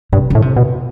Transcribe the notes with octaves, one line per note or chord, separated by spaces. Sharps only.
G2 C3
A2 D3
C3
B2